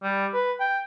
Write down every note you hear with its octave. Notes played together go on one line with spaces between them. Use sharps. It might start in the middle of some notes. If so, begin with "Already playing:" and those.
G3
B4
G5